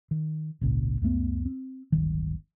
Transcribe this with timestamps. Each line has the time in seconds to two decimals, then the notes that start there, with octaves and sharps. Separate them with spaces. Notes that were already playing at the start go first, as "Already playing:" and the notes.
0.11 D#3
0.61 G#1 C#2 A#2
1.01 C#2 F#2 A3 B3
1.45 C4
1.92 D1 G1 D#3